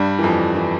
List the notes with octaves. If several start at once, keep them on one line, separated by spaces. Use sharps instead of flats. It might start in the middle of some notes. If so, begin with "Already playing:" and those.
Already playing: G2 G3
E3
F2 F3
E3